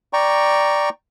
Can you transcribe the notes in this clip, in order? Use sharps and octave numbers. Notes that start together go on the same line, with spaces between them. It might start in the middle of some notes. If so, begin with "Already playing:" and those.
D5 G5 A#5 C#6